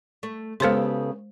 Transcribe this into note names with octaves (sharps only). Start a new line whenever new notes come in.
A3
C#3 G#3 B3 G4 A4 C5 C6